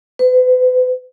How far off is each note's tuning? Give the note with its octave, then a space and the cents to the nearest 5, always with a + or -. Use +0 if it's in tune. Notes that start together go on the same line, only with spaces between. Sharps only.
B4 +40